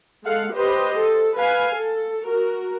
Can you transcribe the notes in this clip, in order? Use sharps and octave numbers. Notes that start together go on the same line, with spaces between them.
G#3 A4 F5 F#5
G4 B4 C5 D#5
A4
B4 F5 G#5
A4
F#4 A#4